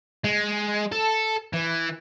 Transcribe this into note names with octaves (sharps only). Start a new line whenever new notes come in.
G#3
A4
E3